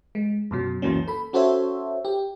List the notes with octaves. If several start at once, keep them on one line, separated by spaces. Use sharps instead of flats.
G#3
F#2 B2 F#3
C#2 F#2 E3 F#3 A#3 C#4
A4 B5
C#4 F#4 A4 C5 C#5 E5
G4